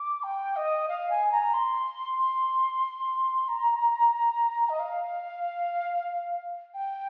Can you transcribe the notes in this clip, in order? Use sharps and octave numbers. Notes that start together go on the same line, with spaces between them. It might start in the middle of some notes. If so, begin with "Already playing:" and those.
Already playing: D6
G5
D#5
F5
G#5
A#5
C6
C6
A#5
D#5
F5
G5